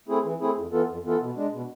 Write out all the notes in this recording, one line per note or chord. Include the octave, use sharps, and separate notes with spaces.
A3 C4 E4 G#4
E3
A3 C4 E4 G#4
F2
E3 B3 F4 A4
F2
E3 B3 F4 A4
B2
G#3 D4
B2